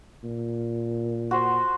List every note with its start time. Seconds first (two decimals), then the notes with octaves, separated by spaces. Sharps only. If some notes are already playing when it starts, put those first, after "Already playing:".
0.24 A#2
1.31 F#4 C5